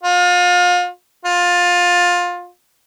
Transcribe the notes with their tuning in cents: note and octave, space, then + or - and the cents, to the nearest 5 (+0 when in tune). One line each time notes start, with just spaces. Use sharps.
F4 +35
F4 +20